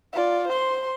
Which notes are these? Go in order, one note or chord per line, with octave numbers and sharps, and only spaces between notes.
F4 D5
C5 C6